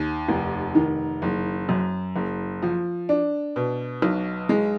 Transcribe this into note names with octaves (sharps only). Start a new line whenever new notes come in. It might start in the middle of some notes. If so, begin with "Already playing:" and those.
Already playing: D#2
F1
D#3
F#1
F#2
F#1
F3
D4
B2
B1
G#3